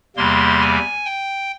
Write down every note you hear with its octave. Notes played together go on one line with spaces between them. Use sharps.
E2 C3 G3 A#3 C6
G#5
G5